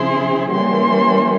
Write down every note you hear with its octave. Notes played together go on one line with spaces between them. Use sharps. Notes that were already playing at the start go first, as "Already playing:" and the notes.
Already playing: C#3 F3 C4 E4 G#4 C6
E3 G3 A#3 C#4 G4 C6